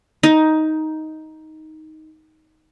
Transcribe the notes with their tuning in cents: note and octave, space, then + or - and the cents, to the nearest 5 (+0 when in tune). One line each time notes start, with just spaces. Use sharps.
D#4 +10